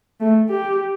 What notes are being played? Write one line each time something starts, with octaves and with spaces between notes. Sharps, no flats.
A3
G4